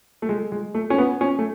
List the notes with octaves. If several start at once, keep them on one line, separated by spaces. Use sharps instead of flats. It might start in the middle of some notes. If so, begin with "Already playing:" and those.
A3
G#3
G#3
A3
C#4
B3
C#4
A3